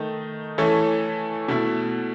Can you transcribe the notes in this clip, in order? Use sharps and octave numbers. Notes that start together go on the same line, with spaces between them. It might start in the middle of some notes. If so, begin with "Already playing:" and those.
Already playing: D#3 A3 D#4
E3 A3 C#4 E4 A4
B2 A3 E4